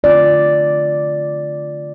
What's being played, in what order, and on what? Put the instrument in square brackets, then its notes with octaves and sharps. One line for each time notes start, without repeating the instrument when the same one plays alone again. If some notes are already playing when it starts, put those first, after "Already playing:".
[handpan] D3 A3 C4 F4 D5